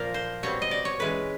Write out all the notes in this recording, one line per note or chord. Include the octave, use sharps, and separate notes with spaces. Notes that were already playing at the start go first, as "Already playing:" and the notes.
Already playing: A#2 F3 A#3 A#4
C5
B2 G3 C4 C#5
D#5
D5
C#5
E3 G#3 C#4 B4